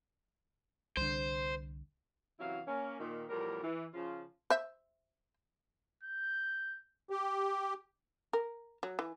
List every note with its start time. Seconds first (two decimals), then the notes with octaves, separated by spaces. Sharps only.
0.97 C2 D3 C5
2.40 F#2 C3 E3 F#3 E4 F5
2.67 A#3 C#4
3.00 A#2 D#3
3.29 E2 A2 F3 G3 A#4
3.63 E3
3.94 C#3 F3 F4
4.50 C5 E5
6.03 G6
7.10 G4
8.33 A#4
8.83 F#3
8.99 E3